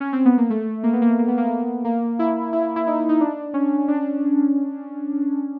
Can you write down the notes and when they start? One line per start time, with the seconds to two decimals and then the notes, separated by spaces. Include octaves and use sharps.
0.00 C#4
0.13 C4
0.25 B3
0.38 A#3
0.50 A3
0.83 A#3
0.93 B3
1.02 A#3
1.11 B3
1.19 A#3
1.28 B3
1.38 A#3
1.85 A#3
2.19 E4
2.53 E4
2.76 E4
2.87 D#4
3.09 D#4
3.21 D4
3.54 C#4
3.88 D4